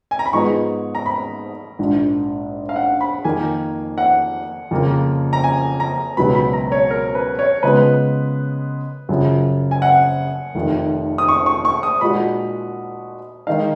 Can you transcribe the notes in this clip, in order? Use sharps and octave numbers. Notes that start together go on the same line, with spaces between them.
G#5
A#5
B5
G#2 F3 B3 D#4 G#4 C#6
A#5
B5
A#1 G#2 F3
F5
F#5
B5
F2 D#3 A#3 G#5
F#5
F2 C#3 F3 A#3
A#5
G#5
A#5
C#2 B2 F#3 B3 B5
B5
A#5
C#5
A#4
B4
C#5
C#3 F3 G#3 B3 B4
F#2 C#3 F3
G#5
F#5
F1 F2 D#3
D#6
C#6
C#6
C#6
D#6
A#2 G#3 D#4 F#4 B5
D#3 G#3 D#4 F5